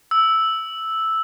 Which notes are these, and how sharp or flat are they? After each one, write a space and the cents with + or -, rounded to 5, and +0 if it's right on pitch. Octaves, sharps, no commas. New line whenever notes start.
E6 -5